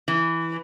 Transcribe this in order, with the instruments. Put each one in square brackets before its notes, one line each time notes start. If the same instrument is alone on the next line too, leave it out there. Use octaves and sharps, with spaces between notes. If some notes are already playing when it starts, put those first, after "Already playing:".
[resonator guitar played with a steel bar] E3